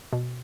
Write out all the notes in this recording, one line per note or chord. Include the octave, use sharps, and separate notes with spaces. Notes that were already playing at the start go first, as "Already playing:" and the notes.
B2